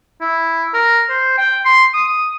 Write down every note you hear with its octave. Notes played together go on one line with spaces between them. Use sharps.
E4
A#4
C5
G5
C6
D#6